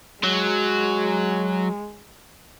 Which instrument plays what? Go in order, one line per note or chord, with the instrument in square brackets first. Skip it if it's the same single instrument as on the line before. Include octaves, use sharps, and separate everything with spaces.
[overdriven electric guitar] F#3 [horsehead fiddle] G#3